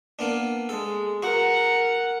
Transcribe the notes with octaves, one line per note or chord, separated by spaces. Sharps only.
A#3 B3 D4
G#3 A4
F#4 A#4 F#5